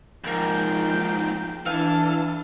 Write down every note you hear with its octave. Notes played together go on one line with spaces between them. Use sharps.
D#2 G#2 F3 A#3 A#4 G5 G6
E3 D4 A4 F5 G#5